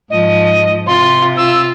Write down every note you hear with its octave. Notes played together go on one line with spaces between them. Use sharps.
G#2 F3 D#5
C3 F4 C6
F4 E6